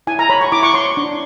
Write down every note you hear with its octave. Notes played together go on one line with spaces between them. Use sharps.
E4 G#5
A#5
C#5 B5
C#6
E4 D6
C#6
C#5 C6
D4